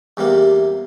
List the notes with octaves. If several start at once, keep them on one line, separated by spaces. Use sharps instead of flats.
E2 C3 G3 A#3